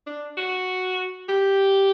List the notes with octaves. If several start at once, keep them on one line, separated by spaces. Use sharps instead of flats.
D4
F#4
G4